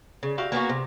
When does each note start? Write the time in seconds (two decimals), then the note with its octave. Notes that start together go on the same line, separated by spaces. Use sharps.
0.23 C#3
0.38 F#4 G4 E5 F5
0.52 A#3 B3 C#4 F#4
0.69 C3